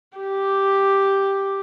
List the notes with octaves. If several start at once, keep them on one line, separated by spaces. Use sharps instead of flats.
G4